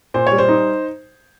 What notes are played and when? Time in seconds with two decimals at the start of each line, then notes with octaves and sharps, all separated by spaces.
0.14 A#2 C5
0.27 C#5
0.32 G3
0.38 C5
0.49 D#4